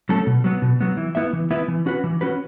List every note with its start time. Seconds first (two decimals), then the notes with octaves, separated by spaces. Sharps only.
0.09 F#3 A3 C#4 A4
0.27 B2
0.44 F#3 B3
0.62 B2
0.81 F#3 B3
0.97 E3
1.15 B3 E4 B4 E5
1.33 E3
1.51 B3 E4 B4 E5
1.68 E3
1.86 C#4 F#4 B4
2.04 E3
2.21 C#4 F#4 B4